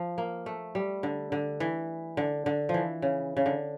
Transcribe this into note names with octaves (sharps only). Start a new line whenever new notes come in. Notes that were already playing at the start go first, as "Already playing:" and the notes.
Already playing: F3
A#3
A3
G3
D3
D3
E3
D3
D3
F3
E3
C#3
C#3
D3